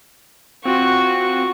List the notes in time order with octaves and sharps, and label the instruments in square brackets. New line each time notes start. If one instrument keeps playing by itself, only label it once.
[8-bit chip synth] C4 F4 [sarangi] F#4 [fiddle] C#6